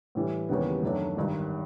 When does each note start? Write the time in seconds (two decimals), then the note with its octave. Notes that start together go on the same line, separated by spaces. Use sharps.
0.15 A2 E3 G3
0.49 D#2 C#3 E3 G3 B3
0.83 F#2 D#3 F#3 A3 D4
1.17 G#1 G2 D#3